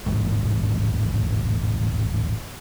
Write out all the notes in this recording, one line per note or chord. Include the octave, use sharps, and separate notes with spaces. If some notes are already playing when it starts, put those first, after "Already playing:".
D#1 A1 G#2